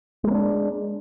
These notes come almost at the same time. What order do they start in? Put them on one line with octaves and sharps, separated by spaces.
G#3 A#3 C#4 D4